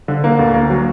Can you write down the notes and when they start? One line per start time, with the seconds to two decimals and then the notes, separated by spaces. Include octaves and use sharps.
0.08 D3
0.24 A#3
0.39 D2
0.54 A#3
0.70 F#3